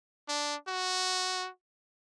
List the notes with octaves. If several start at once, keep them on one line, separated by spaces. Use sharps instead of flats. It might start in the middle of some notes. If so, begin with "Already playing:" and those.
D4
F#4